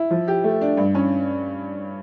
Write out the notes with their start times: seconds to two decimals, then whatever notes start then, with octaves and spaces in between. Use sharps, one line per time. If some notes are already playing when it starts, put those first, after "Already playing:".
Already playing: E4
0.10 F3
0.28 G4
0.44 A3
0.61 D4
0.77 G2
0.95 C#4